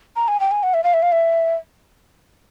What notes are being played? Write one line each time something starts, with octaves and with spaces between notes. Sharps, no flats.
A#5
G#5
G5
G#5
F#5
E5
F5
E5
F5
E5